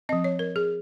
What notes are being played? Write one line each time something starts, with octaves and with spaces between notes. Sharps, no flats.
F3 C4 D#5
C#5
A#4
G#4